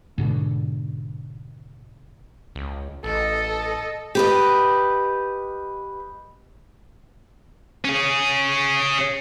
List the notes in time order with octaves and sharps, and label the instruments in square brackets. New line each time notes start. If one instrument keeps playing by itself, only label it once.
[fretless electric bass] G#2 B2 D3
[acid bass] C#2
[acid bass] A1 [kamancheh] A4 D#5
[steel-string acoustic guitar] G4 B4 D#5
[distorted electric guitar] C#4 G#4